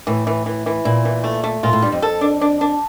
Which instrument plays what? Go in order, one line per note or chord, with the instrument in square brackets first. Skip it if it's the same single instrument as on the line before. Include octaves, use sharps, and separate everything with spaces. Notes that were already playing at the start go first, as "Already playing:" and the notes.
[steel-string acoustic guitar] A2 [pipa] E3
[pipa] E3
E3
E3
[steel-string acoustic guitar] A#2 [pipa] E4
[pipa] E3
A3
A3
[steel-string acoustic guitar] A#2 [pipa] F4
[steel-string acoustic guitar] A2
[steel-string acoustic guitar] G2 [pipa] G3
[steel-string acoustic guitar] F2
[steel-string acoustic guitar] F2 [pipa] A4
[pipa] D4
D4
D4